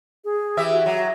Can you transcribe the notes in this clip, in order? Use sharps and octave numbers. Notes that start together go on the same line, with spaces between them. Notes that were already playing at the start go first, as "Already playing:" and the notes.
G#4
E3 G4 E5
F#4
F#3